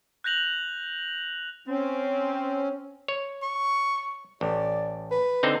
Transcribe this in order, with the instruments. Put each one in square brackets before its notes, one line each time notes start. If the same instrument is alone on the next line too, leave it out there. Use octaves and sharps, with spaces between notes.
[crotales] F#6 G6 A#6 F7 F#7
[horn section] C4 [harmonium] C#4
[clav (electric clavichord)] C#5
[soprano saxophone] C#6
[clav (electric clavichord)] A1 [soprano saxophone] D5
[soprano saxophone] B4
[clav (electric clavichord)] D3 C4 D#4